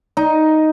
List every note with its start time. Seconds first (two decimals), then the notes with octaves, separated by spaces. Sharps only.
0.17 D#4